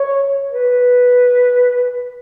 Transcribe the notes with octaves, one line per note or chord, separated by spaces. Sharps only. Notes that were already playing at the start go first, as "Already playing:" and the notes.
Already playing: C#5
B4